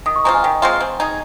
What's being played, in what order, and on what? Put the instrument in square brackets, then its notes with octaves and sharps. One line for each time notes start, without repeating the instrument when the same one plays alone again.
[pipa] D#3 [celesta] D#6
[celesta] C#6
[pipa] G#3 C4 F4 [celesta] A#5
[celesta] G#5
[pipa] D#3 [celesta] G5
[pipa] G#3 C4 F4
C4
D#4 G#4